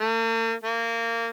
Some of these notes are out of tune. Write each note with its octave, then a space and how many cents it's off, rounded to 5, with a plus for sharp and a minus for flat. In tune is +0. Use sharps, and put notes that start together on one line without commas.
A#3 -45
A#3 -20